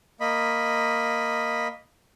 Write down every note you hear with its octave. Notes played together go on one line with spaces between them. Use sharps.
A#3 D#5 B5